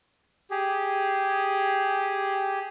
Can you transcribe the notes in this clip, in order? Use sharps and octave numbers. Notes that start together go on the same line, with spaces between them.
G4 G#4